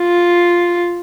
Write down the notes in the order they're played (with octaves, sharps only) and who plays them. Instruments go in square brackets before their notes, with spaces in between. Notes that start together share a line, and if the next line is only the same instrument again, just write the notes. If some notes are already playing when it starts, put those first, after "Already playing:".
Already playing: [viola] F4